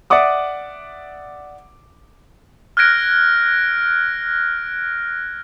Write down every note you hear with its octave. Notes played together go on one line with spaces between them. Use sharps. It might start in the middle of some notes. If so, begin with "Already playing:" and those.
D5 E5 F#5 D6 D#6
F6 F#6 G#6 A#6 D7